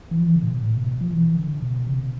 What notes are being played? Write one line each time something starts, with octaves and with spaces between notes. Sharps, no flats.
E3
F3
E3
D3
A2
B2
A2
B2
B2
F3
E3
D3
B2
C3